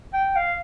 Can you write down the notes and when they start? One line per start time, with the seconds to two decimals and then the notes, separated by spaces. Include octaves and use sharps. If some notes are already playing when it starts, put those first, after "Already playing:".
0.13 G5
0.36 F5